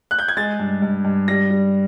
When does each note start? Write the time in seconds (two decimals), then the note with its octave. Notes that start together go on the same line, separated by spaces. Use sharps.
0.11 F#6
0.19 G6
0.28 G#6
0.37 G#3 A6
0.59 G2
0.82 G2
1.05 G2
1.28 G3 A#6
1.51 G3